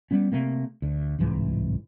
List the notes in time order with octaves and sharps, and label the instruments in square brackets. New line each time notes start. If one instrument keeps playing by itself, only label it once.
[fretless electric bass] G3 B3 C#4
C3 A3 A#3 C4
D2
D1 C2 G#2 E3